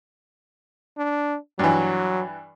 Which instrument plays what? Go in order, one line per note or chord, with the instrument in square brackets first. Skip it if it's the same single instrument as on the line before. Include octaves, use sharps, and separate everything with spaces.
[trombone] D4
[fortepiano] G2 E3 [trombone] F#3